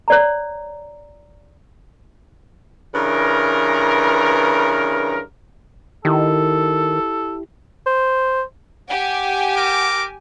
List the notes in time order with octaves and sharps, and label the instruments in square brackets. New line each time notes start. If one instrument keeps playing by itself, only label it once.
[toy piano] C#5 D5 A#5
[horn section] G2 C#3 E3 A#4
[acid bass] D#3 [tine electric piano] E4 G4 [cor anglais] A4
[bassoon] C5
[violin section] G4 G#5 [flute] F#5
[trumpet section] A#4 D6